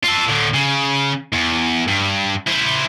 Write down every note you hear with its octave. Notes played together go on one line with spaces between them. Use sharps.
F4 A4
A2 D3
C#3
E2
G2
E4 C5